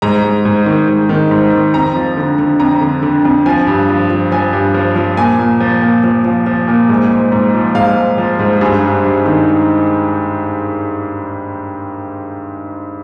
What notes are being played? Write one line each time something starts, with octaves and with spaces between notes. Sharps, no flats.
G#2 A#5
G#2
G#2
D#3
G#2
D#3
G#2
D#3
F2 A#5
F3
D3
D3
F2 A#5
D3
D3
F2
F3 G#5
G2
F3
F3
F3 G#5
G2
F3
F3
A#2 G#5
A#2
F3
A#2
F3
F3
F3
A#2
G#2
G#2
G#2
F3
G#2 F5
G#2
F3
G#2
G2 G#4
G2
G2
D#3